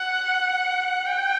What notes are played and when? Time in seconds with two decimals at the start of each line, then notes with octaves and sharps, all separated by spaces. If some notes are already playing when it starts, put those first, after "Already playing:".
Already playing: F#5
1.06 G5